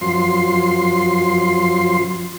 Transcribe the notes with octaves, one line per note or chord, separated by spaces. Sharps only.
F#2 F3 C6